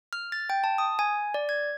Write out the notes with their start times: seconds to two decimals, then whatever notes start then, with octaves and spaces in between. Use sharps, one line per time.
0.13 F6
0.32 A6
0.50 G5
0.64 A5
0.78 D#6
0.99 G#5
1.34 D5
1.49 G#6